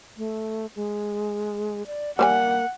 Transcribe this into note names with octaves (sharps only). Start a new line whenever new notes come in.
A3
G#3
D5
G3 A#3 C5 F#5 G#5